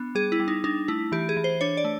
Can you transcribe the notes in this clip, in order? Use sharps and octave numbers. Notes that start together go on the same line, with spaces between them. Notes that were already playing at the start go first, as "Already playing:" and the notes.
Already playing: B3 D4
G3 G#4
E4
G3
D#4
D4 D#4
A3 E4
E3 G4
G#4
E3
C5
D4 C#5
D5
A3